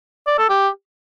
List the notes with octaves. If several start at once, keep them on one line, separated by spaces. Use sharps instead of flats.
D5
A4
G4